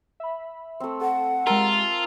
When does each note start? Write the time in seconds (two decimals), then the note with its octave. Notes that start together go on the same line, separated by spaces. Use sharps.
0.20 E5 B5
0.80 A3 C4
1.01 A4 F#5
1.47 G#3 F4 G4 A#4 E5 A5